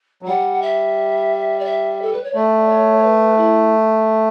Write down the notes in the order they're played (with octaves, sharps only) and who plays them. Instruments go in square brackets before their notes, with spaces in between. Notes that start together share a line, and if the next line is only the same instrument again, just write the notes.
[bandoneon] F#3
[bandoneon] G3 [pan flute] F#5
[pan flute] E5
D5
E5
A4
B4
C#5
[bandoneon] A3 [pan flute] D5
[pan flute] C#5
C#5
B4
E4